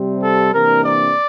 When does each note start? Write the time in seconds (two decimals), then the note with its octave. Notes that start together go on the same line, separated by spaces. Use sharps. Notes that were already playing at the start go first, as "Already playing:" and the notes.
Already playing: C3 G3 C4
0.21 A4
0.52 C3 E3 A#3 D4 A#4
0.85 D5